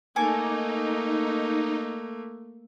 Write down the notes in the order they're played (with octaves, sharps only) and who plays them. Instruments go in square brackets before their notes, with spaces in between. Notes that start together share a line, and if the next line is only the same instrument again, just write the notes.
[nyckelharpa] A3 A#3 [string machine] D#4 [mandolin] A4 G#5 D6